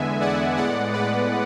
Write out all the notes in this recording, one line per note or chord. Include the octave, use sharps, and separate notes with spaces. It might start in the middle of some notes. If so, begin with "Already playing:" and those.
Already playing: E2 D3 G#3 B3 E5 G#5
D5 F#5
A2 G#3 B3 D5 F#5
B4 D5